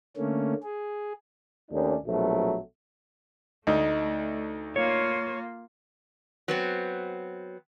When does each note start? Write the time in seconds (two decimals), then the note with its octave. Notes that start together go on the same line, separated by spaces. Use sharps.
0.17 D3 A3 A#3 C#4
0.63 G#4
1.70 D#2 A3 C#4 D4
2.06 A#1 B2 F#3 A3
3.67 D2 A3 D#4
4.76 A#3 F4 C#5
6.48 F#3 B3 C4